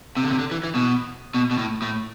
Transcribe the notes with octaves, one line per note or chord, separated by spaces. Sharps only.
C3
D3
C3
D3
E3
E3
B2
B2
B2
A2
A2